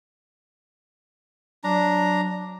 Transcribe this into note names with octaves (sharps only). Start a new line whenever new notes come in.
F#3 D4 A#5